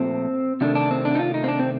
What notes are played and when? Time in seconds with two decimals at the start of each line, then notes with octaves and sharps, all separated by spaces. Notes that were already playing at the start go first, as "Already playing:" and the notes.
Already playing: A#2 F3 A3 C4
0.61 C3 D#3 A3 D4
0.75 D4
0.91 C4
1.05 D4
1.15 D#4
1.19 F4
1.34 D#4
1.44 C4
1.48 D4
1.60 C4